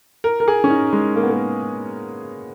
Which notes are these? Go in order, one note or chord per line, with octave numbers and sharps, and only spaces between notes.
A#4
A#4
G#4
C#4
D#4
G#3
A#3
B3
A#3